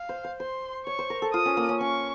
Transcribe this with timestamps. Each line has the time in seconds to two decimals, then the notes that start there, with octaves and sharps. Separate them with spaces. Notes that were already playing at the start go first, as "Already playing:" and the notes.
Already playing: F5
0.09 C5
0.24 C5
0.40 C5 C6
0.86 C#5 C#6
0.99 C5
1.10 A#4
1.22 A4
1.34 F4 D#6
1.45 C#4
1.57 A#3
1.69 C#4
1.80 C#4 C#6